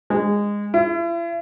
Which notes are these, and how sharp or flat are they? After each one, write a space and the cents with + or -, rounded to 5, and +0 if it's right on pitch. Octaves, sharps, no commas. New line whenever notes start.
G#3 -15
E4 +45